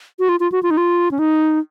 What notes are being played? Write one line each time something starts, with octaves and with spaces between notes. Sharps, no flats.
F#4
F4
F4
F#4
F4
D#4
F4
C#4
D#4